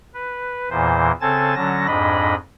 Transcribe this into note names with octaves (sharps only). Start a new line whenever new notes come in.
B4
E2 A#2 E3 C5
C#3 C4 A4 G#5 A5 A6
D3 F#3 C#4 A5 A#6
F2 G#2 D4 D#5 B5